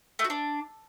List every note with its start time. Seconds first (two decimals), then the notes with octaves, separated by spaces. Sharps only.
0.19 A3
0.24 F#4
0.30 D4